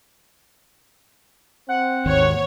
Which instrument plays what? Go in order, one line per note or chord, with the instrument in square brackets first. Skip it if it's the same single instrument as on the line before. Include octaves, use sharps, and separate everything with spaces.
[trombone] C4 [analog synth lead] F#5
[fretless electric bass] G#1 D#2 [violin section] C#5